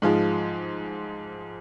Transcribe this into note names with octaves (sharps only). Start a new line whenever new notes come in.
G#2 F3 G#3